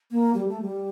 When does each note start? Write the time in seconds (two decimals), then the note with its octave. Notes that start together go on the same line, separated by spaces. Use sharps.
0.11 A#3
0.34 G3
0.48 A3
0.62 G3